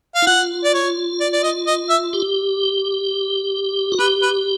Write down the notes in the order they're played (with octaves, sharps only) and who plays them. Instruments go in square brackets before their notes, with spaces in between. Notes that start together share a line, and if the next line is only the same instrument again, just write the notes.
[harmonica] F5
[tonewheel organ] E4
[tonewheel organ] F4 [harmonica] F#5
[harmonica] D5
C#5
D5
D5
D#5
D#5
E5
[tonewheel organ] G4
F#4
[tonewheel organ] G4 [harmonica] B4
[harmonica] B4